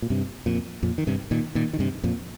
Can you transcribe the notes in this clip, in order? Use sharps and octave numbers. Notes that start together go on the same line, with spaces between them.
A#2
G2 C3
F2 A#2
F2 A#2
D#3
G2 C3
A#2 D#3
A#2 D#3
D#3
G2 C3
F2 A#2